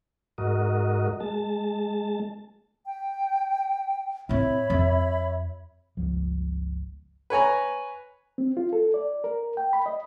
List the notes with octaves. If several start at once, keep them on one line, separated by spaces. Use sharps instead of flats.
G#2 F#4 A#4 D#5
G#3 A5
G5
A2 C4 C#5 E5 B5
F2
G1 C#2 F3
B4 C#5 G#5 A#5
C4
F4
A4
D5
A#4
G5
B5
D#5